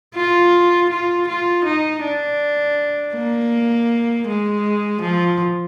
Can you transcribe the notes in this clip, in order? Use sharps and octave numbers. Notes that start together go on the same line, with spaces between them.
F4
F4
F4
D#4
D4
A#3
G#3
F3